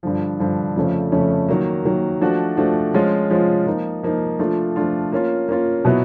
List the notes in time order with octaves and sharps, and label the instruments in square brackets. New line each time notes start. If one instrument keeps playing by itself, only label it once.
[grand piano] G2 D3 F3
G2 D3 F3
F2 C#3 F3 A3 C#4
F2 C#3 F3 A3 C#4
D#3 F#3 A#3
D#3 F#3 A#3
F3 A3 D4 F#4
F3 A3 D4 F#4
F3 G#3 C#4 F4
F3 G#3 C#4 F4
F3 A#3 D#4
F3 A#3 D#4
F3 A3 D4 F4
F3 A3 D4 F4
A#3 C#4 F4
A#3 C#4 F4
B2 F#3 B3 E4